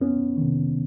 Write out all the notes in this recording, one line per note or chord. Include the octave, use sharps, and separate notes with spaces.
F2 B3 C#4
C3 D#3